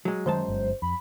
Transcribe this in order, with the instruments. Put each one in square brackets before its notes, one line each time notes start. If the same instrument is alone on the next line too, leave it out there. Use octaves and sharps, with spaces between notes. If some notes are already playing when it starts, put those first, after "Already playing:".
[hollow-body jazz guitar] F#3 G#3
[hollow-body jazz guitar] F#2 G#3 A5 [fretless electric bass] D#3 F#3 [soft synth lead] C5
[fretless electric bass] G1
[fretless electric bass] F2 [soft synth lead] B5